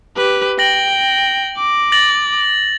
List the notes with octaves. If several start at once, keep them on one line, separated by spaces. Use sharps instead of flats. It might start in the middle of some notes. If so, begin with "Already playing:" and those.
G4 B4
G5 A#6 F#7
D6
A6 A#6 F#7